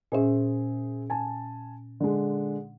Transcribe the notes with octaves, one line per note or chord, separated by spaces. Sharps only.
A#2 C#4 G#4 C5 E5
G#5 A5
D3 G#3